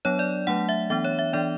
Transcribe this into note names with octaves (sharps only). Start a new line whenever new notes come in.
F#3 B3 D4 C#5
D5
F#3 A3 D4 F#5
E5
E3 B3 D4 E5
C#5
E5
E3 B3 D4 D5